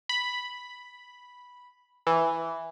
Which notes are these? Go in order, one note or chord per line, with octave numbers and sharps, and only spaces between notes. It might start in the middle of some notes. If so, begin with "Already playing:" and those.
B5
E3